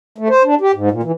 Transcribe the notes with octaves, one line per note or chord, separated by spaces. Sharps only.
A3
C5
D4
G4
G#2
A#2
E3